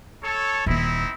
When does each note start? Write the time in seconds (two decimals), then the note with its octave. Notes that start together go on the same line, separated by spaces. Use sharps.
0.23 A4 C#5
0.66 D#1 D#3 C4 D#4 E4